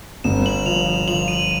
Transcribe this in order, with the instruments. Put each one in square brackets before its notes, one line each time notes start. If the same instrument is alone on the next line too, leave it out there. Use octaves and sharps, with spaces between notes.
[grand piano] G1 [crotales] E7
[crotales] F#7
[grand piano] F3 [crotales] F7
[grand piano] F3 [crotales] F#7
[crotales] D#7